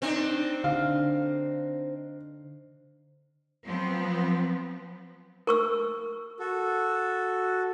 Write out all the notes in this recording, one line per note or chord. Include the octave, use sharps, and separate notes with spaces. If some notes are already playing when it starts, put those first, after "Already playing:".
C4 D4 D#4
D3 F5
F3 F#3 B3 C4
A#4 C#6 E6
F#4 A4